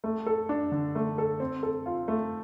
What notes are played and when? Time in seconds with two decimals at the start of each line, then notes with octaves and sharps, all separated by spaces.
0.04 A3
0.26 A4
0.49 D4
0.72 D3
0.95 A3
1.18 A4
1.40 C4
1.63 A4
1.86 F4
2.08 A3